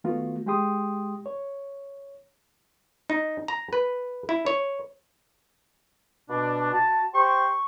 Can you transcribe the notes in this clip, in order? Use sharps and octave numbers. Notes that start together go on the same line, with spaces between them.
D#3 A3 B3 F4 F#4
G#3 G4 G5 C6 D#6
C#5
D#4
A#5
B4
E4
C#5
B2 D4
F#4 A5
G4 C5 C6 C#6